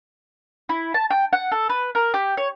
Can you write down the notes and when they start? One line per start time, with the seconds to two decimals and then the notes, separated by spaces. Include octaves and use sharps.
0.69 E4
0.94 A5
1.10 G5
1.33 F#5
1.52 A4
1.69 B4
1.95 A#4
2.14 G4
2.37 C#5